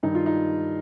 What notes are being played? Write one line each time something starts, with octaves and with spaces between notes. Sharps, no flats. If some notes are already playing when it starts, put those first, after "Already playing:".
G2 D#3 G3 D#4
F4
D#4